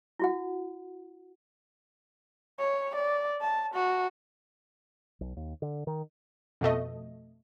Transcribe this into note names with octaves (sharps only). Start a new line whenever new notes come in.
E4 F#4 F#5
C#5
D5
A5
F#4
B1
D#2
D3
D#3
F2 B2 A3 D#5